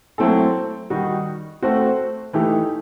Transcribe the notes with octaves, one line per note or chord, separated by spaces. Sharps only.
F#3 A3 C4 E4 A4
D#3 G3 D#4 F#4
A3 C4 F#4 C5
E3 A3 D#4 G4